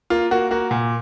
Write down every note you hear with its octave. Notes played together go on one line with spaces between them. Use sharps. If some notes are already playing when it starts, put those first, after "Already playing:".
A#3 F4
A#3 F#4
A#3 F#4
A#2